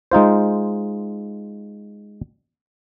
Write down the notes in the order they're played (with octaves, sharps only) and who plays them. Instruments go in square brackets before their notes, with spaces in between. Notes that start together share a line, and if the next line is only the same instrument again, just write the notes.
[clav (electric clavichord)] G#3 D#4 F4 C5